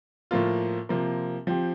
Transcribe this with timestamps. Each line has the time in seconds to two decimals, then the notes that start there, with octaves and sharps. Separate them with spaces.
0.31 A2 F3 A#3 F4
0.89 C3 F3 A#3
1.47 F3 C4 G4